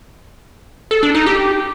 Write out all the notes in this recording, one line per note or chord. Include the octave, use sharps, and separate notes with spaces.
A4
D4
D#4
G4